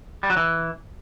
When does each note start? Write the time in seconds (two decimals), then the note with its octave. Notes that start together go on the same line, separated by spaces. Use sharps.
0.23 G3
0.30 F#3
0.37 E3